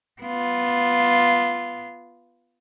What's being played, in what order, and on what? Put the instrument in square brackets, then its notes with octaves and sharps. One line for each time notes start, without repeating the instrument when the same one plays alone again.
[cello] B3 F4